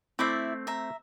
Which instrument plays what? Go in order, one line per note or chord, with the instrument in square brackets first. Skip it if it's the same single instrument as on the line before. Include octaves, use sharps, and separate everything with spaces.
[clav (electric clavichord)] A3 C4 [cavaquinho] E4 D5 E5
[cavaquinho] E5 A#5